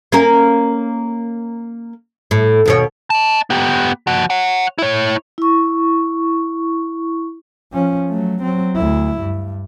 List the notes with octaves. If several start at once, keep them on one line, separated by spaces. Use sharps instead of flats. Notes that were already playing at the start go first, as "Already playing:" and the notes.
A#3 C#4 A#4
A2
D#2 B2 C#5
D#5 A5
B3 G4
F3 F#4
C#5 F#5
E4 C#5
E4 C#6
F3 C#4
F#3 A3
F#3 C4
D2 E4
G2